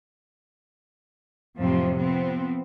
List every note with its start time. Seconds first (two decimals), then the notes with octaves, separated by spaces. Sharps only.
1.58 F2 A2 C3 F3 F#3 C4
1.94 F3 B3 C4